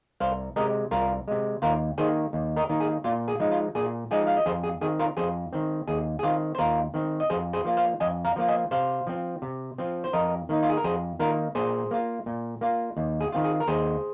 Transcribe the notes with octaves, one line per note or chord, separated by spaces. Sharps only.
C2 C5 F5
C3 G#3 A#4 D#5
C2 F4 A#4
C3 G#3
D#2 F4 A#4
D#3 A#3 D#4 G#4 C5
D#2
A#4 D#5
D#3 A#3 D#4
G#4
A#2 F4
G#4
F3 G#3 D#4
F4
A#2 G#4
F3 G#3 D#4 G#4
F5
D#5
F2 G#4 C5
G#4
D#3 C4 G#4
F4 A#4
F2 G#4 C5
D#3 C4
D#2 G#4
G#4
D#3 C4 F4
C5
D#2 F4 A#4
D#3 C4
D#5
F2 G#4 C5
G#4 C5
F3 A#3 F4
C5 F5
F2 D#5 G#5
F5 A#5
F3 A#3 F4
D#5 G#5
C3 C5 F5
F3 C4
C3
F3 C4
C5
F2 A#4 D#5
D#3 A#3 D#4
F4
G#4
A#4
F2 G#4 C5
D#3 A#3 D#4 F4 A#4
A#2 G#4 C5
A#3 F4
A#2
A#3 F4
D#2
G#4
D#3 C4 F4
G#4
A#4
D#2 G#4 C5